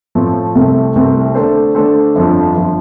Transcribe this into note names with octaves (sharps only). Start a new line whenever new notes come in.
A2 F3 A3 C4
C2 C3 A3 C4
C2 C3 A3 C4
D3 A3 D4 A4 C5
D3 A3 D4 A4 C5
G1 F2 F3
G1 F3